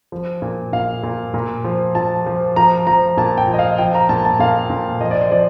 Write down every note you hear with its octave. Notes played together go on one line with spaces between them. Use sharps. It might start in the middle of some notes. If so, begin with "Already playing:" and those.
F3
A#2
A#2 F5
A#2
A#2
F3
F3 A5
F3
F3 A#5
F3 A#5
A#2 A5
G5
F3
D#5
F5
F3 G5
A#5
A#2 A5
A5
A#2 F5
A#2
F3 D#5
D5
C5
F3 D5